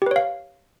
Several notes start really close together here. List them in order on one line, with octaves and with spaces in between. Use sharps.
G4 B4 C#5 F5